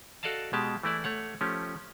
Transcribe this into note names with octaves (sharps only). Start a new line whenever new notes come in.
F#4 A4 D5 D#5 F5 A5
B2 G#3 G4 A5
E3 A3 E4 D5
A3 C#5 F#5
F3 A3 C#4 G4